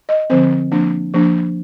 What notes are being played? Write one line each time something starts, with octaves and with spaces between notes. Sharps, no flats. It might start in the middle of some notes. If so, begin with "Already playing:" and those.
D#5
D3 F3 C4 C5
F3 A#3 D4
F3 A#3 D4